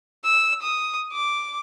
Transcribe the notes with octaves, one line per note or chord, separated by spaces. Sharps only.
E6
D#6
D6